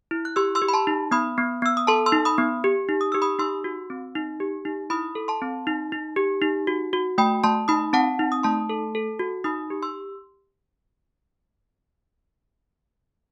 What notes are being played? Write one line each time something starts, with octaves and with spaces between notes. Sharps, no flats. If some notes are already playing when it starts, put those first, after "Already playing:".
E4
F#6
G4 C6 E6
C6 E6
G4
B5
A5 C6
D#4
B3 B5 D#6
B3
B3 E6
D#6
A4 A5 C6
C6 E6
D#4
B5 D#6
B3
G4
D#4
D#6
G4 E6
B5 D#6
D#4 C6 E6
F#4
C4
D#4
G4
D#4
E4 B5 D#6
A4
A5 C6
C4
D#4
D#4
G4
D#4
F#4
F#4
A3 G5 B5
A3 A5 C6
D#4 B5 D#6
C4 F#5 A5
D#4
D#6
A3 A5 C6
A4
A4
F#4
D#4 B5 D#6
G4
C6 E6